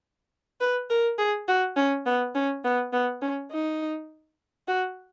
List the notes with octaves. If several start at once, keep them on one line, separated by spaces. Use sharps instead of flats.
B4
A#4
G#4
F#4
C#4
B3
C#4
B3
B3
C#4
D#4
F#4